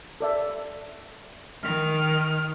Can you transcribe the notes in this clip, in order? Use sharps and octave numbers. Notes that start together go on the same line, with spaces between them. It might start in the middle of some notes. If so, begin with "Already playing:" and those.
A4 D5 E5
D#3 F6